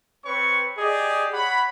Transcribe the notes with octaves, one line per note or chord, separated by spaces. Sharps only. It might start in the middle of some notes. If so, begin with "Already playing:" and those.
C4 B4 C#5 C#6
G4 G#4 D5 D#5
C#5 F#5 B5